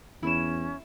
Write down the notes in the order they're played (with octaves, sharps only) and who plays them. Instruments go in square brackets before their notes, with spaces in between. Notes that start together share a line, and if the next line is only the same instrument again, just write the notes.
[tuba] E2 [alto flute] C#4 [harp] E4 E7